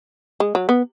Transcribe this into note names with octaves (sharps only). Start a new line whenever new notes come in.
G#3
F#3
B3